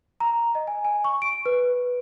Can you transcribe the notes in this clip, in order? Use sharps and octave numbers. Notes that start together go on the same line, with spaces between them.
A#5
D#5
G#5
G#5
C#6
D7
B4